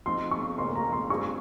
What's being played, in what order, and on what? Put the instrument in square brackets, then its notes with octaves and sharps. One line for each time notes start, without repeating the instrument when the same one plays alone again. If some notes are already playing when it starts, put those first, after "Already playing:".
[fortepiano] F3 C4 D#4 [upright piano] C6
[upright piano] C#6
[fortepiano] F2 C#3 F3 A#3 [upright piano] C6
[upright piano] A#5
C6
[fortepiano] G2 G3 C4 F4 G#4 [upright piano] C#6